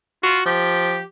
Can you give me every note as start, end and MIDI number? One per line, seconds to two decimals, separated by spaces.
0.23 0.38 65
0.23 0.42 66
0.46 1.02 53
0.46 1.01 67